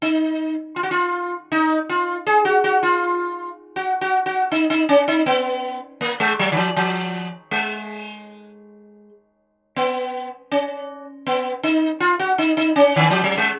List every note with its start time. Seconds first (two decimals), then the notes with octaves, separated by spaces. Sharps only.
0.02 D#4
0.76 F4
0.83 F#4
0.91 F4
1.52 D#4
1.89 F4
2.27 G#4
2.45 F#4
2.64 F#4
2.83 F4
3.76 F#4
4.01 F#4
4.26 F#4
4.52 D#4
4.70 D#4
4.89 C#4
5.08 D#4
5.26 B3
6.01 A#3
6.20 G#3
6.39 F#3
6.52 D#3
6.57 F3
6.76 F3
7.51 G#3
9.76 B3
10.51 C#4
11.27 B3
11.63 D#4
12.00 F4
12.19 F#4
12.38 D#4
12.57 D#4
12.76 C#4
12.96 D#3
13.10 F3
13.24 F#3
13.38 G#3